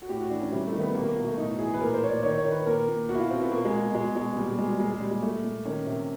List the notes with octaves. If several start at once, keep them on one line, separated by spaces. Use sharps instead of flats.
F#4
A2 G4
F#4
E3 D4
C#4
C3 G3
A3
D#3
B3
B2 A#3
A#3
B2
A3
A2 D#4
E3 G#4
B4
A#2 A#4
C5
A#2 C#5
D5
D#3 C#5
C#5
D#3
B4
A#2 A#4
A#2
B2 F#4
E4
F4
B2 C4
B3
B2 A#3
G#3
B2
B2 G#3
B2 G#3
A#2 G3
G3
A#2 G#3
G3
A#2 G#3
G#3
A#2 G3
G#3
A#2 A3
A#2
D#3 C#4
C3